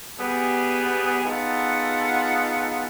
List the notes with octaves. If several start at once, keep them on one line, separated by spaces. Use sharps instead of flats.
G3 B3 G#4
B3 D#4 F4 G#4 A4 F#5